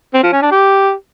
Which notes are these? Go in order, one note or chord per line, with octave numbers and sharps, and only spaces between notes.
C4
F3
C#4
D4
G4